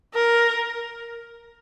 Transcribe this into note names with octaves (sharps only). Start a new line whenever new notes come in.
A#4